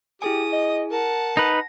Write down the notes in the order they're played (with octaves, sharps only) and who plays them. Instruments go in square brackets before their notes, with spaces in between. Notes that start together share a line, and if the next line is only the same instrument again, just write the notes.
[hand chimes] E4 G#4 G#5 [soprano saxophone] G4 [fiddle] D#6
[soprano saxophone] D#5
[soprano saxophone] A#4 [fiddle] F#5 A5
[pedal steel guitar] D#4 B4 [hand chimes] A#6